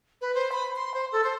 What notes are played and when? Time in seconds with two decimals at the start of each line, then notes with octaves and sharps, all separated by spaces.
0.21 B4
0.35 C5
0.52 B5
0.76 C6
0.94 C5
1.12 A4
1.24 C5